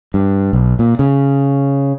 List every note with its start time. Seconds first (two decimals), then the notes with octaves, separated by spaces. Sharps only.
0.14 G2
0.53 B1
0.79 A#2
0.99 C#3